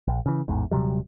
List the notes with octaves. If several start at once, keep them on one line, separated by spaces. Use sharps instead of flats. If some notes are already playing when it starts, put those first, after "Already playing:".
A#1
C#3 E3
A1 E2 G#2
D#1 C3 F#3 G3